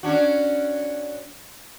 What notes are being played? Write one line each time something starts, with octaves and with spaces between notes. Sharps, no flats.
C#4 D4 F#4